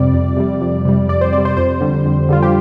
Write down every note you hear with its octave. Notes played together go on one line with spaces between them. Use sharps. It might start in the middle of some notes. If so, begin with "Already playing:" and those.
Already playing: F2 C3 G3 D5
F2
C3 G3
F2
C3 G3
F2 D5
C5
C3 D5
G3
C5
F2 C5
D3 G3
F2
D3 G3 F4
G4